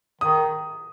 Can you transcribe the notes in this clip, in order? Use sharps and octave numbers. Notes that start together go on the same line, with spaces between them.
D#3 D#6